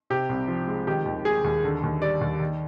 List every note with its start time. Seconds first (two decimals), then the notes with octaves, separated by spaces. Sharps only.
0.10 C3 G4
0.29 C2
0.48 F3
0.68 G#3
0.87 D#3 G4
1.05 D#2
1.25 G#3 G#4
1.44 D#2
1.64 D3
1.83 D#2
2.02 G3 D5
2.21 D#2
2.40 D#3